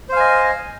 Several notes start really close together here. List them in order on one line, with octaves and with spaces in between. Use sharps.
C5 F5 G#5 D#5